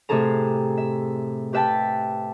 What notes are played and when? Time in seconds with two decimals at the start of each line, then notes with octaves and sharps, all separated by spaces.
0.09 A2 C3 C4 G#4 A4 A#5
0.78 E5
1.53 G4 B4 E5 G5 A5